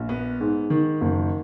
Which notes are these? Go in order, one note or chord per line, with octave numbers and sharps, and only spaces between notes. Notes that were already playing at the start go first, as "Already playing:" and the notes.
Already playing: A#1
B3
G#2
D#3
F#1